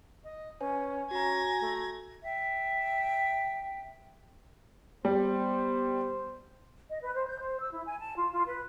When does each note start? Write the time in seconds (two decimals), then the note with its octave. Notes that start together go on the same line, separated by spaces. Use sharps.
0.24 D#5
0.61 C#4 B4 C#5 G#5
1.11 C#4 F#4 A#5 G#6 A#6
1.61 A3
2.24 E5 G5
5.05 G3 B3 C5
6.89 D#5
7.02 B4
7.15 C5
7.27 G6
7.39 C5
7.60 E6
7.73 E4
7.86 G#5
7.99 A5
8.16 F4
8.32 F4
8.46 B4